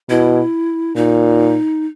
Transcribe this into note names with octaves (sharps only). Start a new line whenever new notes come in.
B2 E4
A#2 D#4